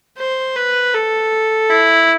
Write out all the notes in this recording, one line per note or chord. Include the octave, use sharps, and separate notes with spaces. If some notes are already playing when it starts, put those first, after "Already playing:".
C5
B4
A4
E4